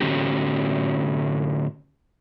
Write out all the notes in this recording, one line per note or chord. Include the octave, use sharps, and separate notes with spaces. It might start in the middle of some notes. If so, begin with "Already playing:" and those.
A2 D3 C#4 F#4 G4